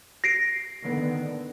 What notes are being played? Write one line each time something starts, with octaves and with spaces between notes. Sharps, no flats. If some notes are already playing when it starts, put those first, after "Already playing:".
A#6 C7 D7
D3 D#3 B3